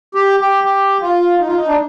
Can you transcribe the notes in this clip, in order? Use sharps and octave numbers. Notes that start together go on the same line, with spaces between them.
G4
G4
G4
F4
D#4
F4
D#4
D4